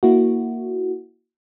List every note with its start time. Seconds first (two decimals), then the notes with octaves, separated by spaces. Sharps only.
0.03 A#3 E4 F#4